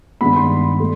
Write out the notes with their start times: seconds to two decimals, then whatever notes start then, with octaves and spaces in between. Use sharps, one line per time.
0.21 G2 D#3 G#3 B3 B5
0.36 C6
0.80 A3